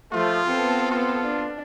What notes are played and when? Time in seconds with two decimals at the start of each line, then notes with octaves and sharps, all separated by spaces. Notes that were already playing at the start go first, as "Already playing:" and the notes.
0.13 F3 A3 F4
0.46 B3 C4 A4
0.91 F4
1.22 D4